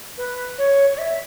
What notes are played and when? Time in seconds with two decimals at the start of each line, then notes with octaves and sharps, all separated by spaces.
0.17 B4
0.58 C#5
0.93 C#5
0.98 E5